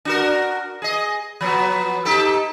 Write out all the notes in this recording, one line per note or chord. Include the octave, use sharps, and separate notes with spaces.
D4 F#4 A#4
G#4 D#5
F3 F#3 B3
D#4 G4 A4